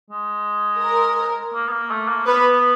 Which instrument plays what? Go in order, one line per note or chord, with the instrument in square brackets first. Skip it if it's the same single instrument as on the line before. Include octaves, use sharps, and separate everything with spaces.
[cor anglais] G#3
[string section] A#4
[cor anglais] A#3
B3
A#3
A3
A#3
[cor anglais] B3 [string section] B4